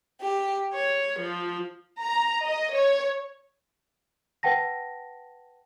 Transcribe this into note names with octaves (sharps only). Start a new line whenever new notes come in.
G4
C#5
F3
A#5
D#5
C#5
B4 F#5 G5 A5 A#6